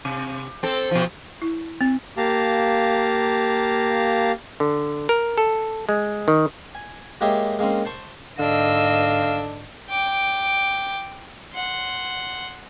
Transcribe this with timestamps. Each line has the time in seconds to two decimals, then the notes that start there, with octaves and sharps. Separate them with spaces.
0.05 C3
0.63 C4 A4
0.91 B2 F3
1.42 E4
1.81 C4
2.17 A#3 G4 F5 A5 A#5
4.60 D3
5.09 A#4
5.38 A4
5.89 G#3
6.28 D#3
6.75 G#5
7.21 G#3 A#3 G4 C#5 D#5 E5
7.59 G#3 A#3 C4 C#4
7.85 C5 A5 C#6
8.39 G#2 D3 D4 D#5 F5 E6
9.90 G5 D6
11.53 F#5 C6